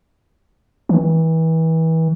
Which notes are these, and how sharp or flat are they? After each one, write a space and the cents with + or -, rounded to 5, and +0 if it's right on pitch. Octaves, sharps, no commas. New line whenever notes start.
E3 -30